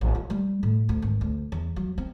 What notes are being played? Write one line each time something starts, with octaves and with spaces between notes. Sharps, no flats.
A1
F4
G3
A2
D2
G#1
D2
E2
F#3
C4